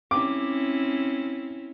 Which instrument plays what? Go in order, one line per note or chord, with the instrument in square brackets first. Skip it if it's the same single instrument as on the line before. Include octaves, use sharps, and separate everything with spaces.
[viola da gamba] C4 C#4 E4 [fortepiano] D6